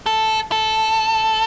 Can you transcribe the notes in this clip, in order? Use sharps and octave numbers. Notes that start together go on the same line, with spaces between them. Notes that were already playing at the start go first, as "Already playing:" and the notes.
A4
A4